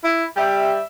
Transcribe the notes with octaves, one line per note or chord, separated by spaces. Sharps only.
E4
G3 G4 E5